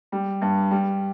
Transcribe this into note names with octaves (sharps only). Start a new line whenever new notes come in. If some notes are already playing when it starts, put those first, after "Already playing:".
G3
G2
G3